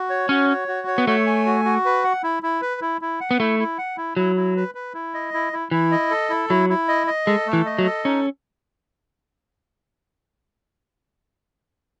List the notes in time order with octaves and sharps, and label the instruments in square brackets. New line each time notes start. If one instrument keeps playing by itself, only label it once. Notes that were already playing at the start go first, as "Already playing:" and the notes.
Already playing: [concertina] F#4
C#5
[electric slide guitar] C#4 [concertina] F#4
[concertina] C#5
F#4
C#5
[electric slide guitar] B3
[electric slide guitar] A3 [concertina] C#5
[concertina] G#5
F#4
F#4
B4
F#5
E4
E4
B4
E4
E4
F#5
[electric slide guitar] B3
[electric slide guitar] A3 [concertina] E4
[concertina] E4
F#5
E4
[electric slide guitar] F#3 [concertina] E4
[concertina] E4
B4
B4
E4
D#5
E4
E4
[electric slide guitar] E3 [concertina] E4
[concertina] D#5
A4
E4
[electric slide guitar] F#3 [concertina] E4
[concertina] E4
D#5
D#5
[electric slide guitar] G#3 [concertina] A4
[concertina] A3
[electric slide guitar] E3
[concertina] D#5
[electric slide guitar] F#3
[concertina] A4
[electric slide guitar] C#4 [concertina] D#4